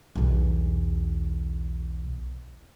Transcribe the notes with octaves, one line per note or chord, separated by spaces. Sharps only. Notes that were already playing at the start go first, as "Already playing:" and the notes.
B1 E2